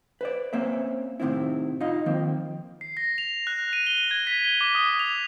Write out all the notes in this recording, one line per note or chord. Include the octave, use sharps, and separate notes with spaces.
B4 C5 D5
A#3 C4 C#4 C5 E5
A2 C3 D#3 C4 E4
D#4 F4 D#5 F5
D#3 F3 A#3 C4
C7
A#6
F7
F#6
D#7
G7
G#6
B6
G7
D6
D#6
F7